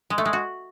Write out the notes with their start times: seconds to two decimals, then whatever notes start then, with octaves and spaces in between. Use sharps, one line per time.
0.10 G#3
0.18 A3
0.25 G#3
0.33 F#4